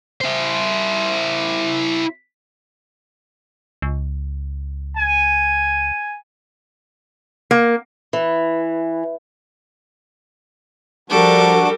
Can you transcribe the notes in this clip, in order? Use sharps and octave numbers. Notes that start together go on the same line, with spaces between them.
E4 C5
C#2
G#5
A#3
E3
F3 G3 D4 F#4 A4 A#4 D6